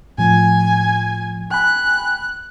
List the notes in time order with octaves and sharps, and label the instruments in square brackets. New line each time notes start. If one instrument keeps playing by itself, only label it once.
[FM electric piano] A2 F3 [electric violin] G#5
[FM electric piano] G5 G#5 B5 [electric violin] F#6